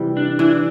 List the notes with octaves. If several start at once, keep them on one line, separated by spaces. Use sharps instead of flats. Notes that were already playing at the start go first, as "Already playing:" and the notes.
Already playing: C3 E3 G3
D4
E3 D4